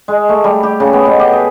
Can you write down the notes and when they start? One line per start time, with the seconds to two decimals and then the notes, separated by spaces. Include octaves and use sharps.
0.08 G#3
0.29 A3
0.44 G3
0.63 G4
0.80 C#3
0.93 B3
1.06 B2
1.19 G4
1.32 G#4